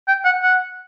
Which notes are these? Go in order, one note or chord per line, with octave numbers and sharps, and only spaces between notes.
G5
F#5
F#5